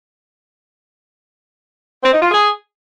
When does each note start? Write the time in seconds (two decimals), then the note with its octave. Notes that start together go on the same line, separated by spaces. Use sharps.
2.03 C4
2.13 D#4
2.22 F4
2.31 G#4